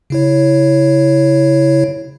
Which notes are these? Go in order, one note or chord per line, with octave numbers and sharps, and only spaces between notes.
C#3 E4 C#5